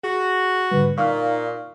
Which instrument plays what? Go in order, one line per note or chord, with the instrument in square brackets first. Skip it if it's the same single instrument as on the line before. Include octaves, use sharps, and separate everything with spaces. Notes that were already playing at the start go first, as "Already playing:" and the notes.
[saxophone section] F#4 [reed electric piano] G#4
[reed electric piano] G#2 D3 G3 [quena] B4
[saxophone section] A#2 [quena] D#4 [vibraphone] D5 F5 [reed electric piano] C#6 F6